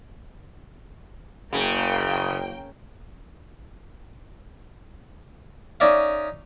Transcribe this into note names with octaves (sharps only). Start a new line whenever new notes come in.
F#1 C#3 A#3 G5
C#4 D#4 D5 E5 F5